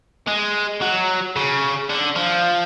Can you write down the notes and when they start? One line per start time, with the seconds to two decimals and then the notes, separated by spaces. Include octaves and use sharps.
0.28 G#3
0.82 F#3
1.36 C#3
1.90 D3
2.16 F3